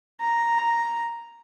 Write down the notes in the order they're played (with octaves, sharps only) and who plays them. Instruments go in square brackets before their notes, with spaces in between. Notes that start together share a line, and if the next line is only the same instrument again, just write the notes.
[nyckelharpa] A#5